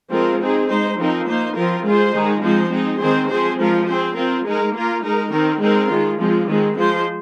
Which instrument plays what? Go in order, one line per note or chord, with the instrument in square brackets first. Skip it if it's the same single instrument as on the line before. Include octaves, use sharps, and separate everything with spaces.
[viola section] F3 G#3 C4 F4 A#4
C4 D#4 G#4
G#3 D#4 C5
F3 C4 D#4 A#4
A#3 D#4 C5
F3 C4 F4 A#4
G#3 F4 G#4 C5
D#3 G#3 D#4 G#4
F3 G#3 C4 D#4 C5
G#3 C4 D#4
D#3 G#3 C4 G#4 C5
F3 C4 G#4 C5
F3 G#3 F4 A#4
C4 G#4 C5
C4 F4 A#4
G#3 D#4 A#4
A#3 F4 A#4
G#3 D#4 A#4
D#3 C4 D#4 A#4
G#3 C4 D#4 A#4
D#3 G#3 F4
F3 G#3 C4 F4
D#3 G#3 C4
F3 G#3 F4 C5